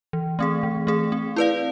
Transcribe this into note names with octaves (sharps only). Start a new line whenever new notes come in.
E3
A3 C4 G#4
E3
A3 C4 G#4
C4
E4 B4 D5 F5